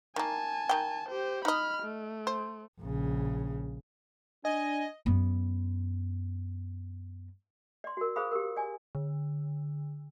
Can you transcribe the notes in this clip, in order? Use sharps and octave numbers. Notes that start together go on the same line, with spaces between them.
D#3 A#3 G#5 A5
D#3 G5
G4 C5
D#4 D#5 B5 F6
A3
C5
A#1 C#3
D4 D#5 G#5
F#2 B3
D5 C6
F#4 A#4
G#4 C5 F5 B5 D#6
G4 A#4
D5 G#5
D3